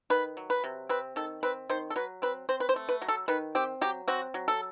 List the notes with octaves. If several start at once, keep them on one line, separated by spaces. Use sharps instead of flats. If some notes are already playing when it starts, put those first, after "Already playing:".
D#3 B4
F#3
B4
C3
C4 B4
D#3 A4
C4 B4
D#3 C5
A4
F#3 B4
C4 B4
C4 C5
B4
C5
A3
B4
F#3
A4
D#3 B4
C4 G4
F#3 G4
C4 F#4
F#3
A4